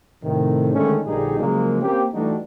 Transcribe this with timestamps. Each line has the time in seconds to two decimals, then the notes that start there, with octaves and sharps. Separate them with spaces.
0.24 A2 C3 D#3
0.74 D3 D#3 G#3 A3 C#4
1.06 A#1 A#2 D3 G3 D#4 G#4
1.40 C#3 F3 F#3 G#3 A#3
1.81 A#3 C4 C#4 G4
2.14 E3 G3 A3 D4 D#4 F#4